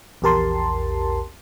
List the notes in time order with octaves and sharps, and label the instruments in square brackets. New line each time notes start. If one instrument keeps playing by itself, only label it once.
[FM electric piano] A#1 E2 G4 A#4 A5 C6